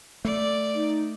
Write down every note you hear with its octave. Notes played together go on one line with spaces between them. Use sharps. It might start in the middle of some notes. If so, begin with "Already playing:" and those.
A3 D5
D#4